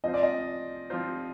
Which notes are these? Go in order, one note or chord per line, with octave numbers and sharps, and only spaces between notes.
F3 C4 F4 C5 D#5
D5
D#5
F3 C4 F4 C5